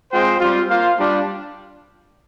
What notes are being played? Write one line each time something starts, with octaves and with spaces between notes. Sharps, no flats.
G#3 C4 F4 C5 G5
G3 C4 F4
A#3 F4 C5 F5
G3 D4 F4